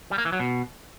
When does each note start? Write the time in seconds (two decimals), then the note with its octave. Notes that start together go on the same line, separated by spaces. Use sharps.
0.11 G3
0.18 A#3
0.25 E3
0.32 F#3
0.40 B2